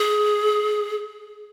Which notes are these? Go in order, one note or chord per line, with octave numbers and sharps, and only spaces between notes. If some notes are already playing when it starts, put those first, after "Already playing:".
Already playing: G#4